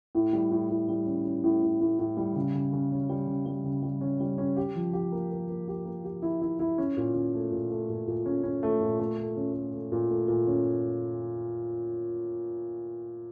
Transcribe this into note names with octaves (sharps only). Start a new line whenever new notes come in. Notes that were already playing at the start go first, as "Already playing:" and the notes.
A2
G3
A2
A2
G3
C#4
C#4
A2
A2
A2
A2
G3
C#3
C#3
C#3
C#4
G3
C#3
G3
C#3
G3
C#4
G3
C#4
G4
F3
G4
A#3
A#3
A#3
G4
A#3
G4
E4
E4
E4
C#4
A#2
C#4
A3
A#2
A3
A#2
A#2
C#4
C#4
A3
A#2
A3
A3
C#4
A3
A3
A#2
A3
A#2
C#4